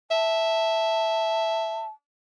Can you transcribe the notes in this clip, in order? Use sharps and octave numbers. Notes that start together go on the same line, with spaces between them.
E5 A5